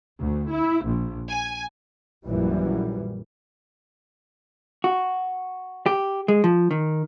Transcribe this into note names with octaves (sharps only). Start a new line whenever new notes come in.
D2
E4
A#1
G#5
A#1 F#2 E3 G3
F#4
G4
G#3
F3
D#3